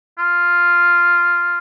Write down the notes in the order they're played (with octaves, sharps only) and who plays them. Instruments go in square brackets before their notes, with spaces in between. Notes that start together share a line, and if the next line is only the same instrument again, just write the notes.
[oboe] F4